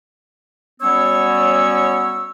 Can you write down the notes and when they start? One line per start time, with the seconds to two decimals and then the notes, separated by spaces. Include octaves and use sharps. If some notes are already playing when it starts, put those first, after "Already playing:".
0.81 F#3 G3 B3 C#4 C#5 E6